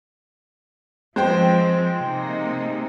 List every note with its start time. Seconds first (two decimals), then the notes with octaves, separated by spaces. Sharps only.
1.16 F3 G#3 C4 C5 G5
1.97 C3 A#3 D#4